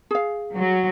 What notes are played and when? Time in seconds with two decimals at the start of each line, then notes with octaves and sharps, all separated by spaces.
0.11 G#4 F5
0.54 F#3